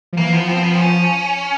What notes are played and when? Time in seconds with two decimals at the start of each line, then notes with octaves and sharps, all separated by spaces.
0.13 F3
0.17 E3 A#3
0.33 F3 B3
0.48 F3 C4
0.64 B3
0.73 C4
0.80 C#4